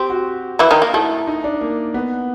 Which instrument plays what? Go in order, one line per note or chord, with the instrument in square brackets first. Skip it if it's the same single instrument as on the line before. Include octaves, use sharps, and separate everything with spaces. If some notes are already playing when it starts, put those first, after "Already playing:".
Already playing: [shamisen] C4 [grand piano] G4
[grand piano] F#4
[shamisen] E3 E4
D#3 D#4
A#3
[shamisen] A3 [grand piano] E4
[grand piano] D#4
D4
A#3
B3